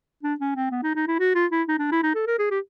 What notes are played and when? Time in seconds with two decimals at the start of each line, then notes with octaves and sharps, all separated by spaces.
0.23 D4
0.40 C#4
0.56 C4
0.71 B3
0.83 D#4
0.95 D#4
1.07 E4
1.19 F#4
1.35 F4
1.51 E4
1.68 D#4
1.79 D4
1.92 E4
2.03 D#4
2.15 A4
2.27 A#4
2.38 G#4
2.51 G4